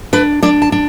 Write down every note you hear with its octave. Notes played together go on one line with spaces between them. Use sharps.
D4 B4
D4 D5
A5
D4